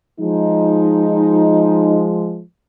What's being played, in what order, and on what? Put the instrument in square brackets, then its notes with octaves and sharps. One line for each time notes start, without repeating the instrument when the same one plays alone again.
[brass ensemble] F3 G#3 [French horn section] D#4